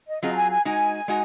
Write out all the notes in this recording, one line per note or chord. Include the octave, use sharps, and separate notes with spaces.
D#5
F#3 C4 F4 G#4 D#5
A#5
G#5
G#5
G#3 D#4 F#4 G#5
G#3 D#4 F#4